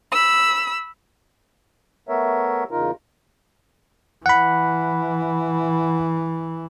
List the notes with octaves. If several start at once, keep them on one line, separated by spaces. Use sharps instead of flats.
B5 E6
A3 B3 A#4 C#5 E5
E2 C#3 D#4 F4 A#4
E3 F#5 B5